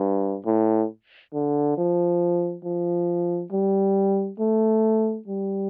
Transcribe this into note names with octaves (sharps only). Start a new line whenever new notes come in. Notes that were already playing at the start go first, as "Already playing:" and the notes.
Already playing: G2
A2
D3
F3
F3
G3
A3
G3